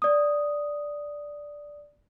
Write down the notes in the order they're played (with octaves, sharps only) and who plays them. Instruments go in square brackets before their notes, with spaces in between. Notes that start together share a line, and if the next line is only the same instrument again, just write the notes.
[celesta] D5 D#6